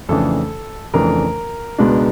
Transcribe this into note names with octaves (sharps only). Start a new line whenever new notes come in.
F2 C#3 E3 A3 D4 A4
F2 C#3 E3 A3 D4 A#4
C#2 B2 G#3 B3 D4